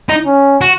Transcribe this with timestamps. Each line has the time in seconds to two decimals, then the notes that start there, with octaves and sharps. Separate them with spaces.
0.09 D#4
0.25 C#4
0.61 F#4